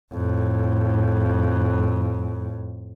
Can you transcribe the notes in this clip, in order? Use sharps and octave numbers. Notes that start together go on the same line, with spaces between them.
F2 A2